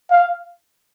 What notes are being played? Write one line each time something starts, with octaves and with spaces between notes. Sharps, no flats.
F5